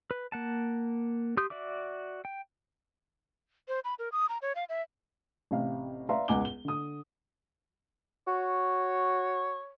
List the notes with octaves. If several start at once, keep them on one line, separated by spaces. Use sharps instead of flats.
B4
A#3 F#5 A5
G4 C6 D#6 G6
F#4 D5 E5 D6
G5
C5
B5
A#4
D#6
A#5
C#5
F5
E5
A1 C3 F5
B4 D5 E5 F5 A#5 C6
E1 C#2 F#5 G#5 D6 G7
G7
D3 D#6
F#4 C#5